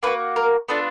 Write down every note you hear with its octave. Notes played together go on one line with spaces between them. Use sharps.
A#3 D4 F#4 B4
A#4
B3 D4 F4 A4